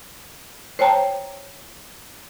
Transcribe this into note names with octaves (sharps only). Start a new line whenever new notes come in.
C5 C#5 G5 A5 A#5